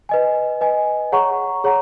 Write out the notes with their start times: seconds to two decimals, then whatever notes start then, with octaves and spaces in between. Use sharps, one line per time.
0.09 B4 D#5 G#5
0.61 B4 D#5 G#5
1.12 G#4 C#5 F#5 A#5 C#6
1.64 G#4 C#5 F#5 A#5